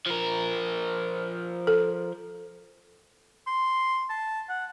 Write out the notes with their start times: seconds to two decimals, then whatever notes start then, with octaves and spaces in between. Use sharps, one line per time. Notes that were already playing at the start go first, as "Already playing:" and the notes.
0.07 F3 A#4
1.67 A4
3.47 C6
4.10 A5
4.49 F#5